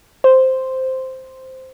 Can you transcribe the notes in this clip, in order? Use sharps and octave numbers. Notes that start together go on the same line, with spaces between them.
C5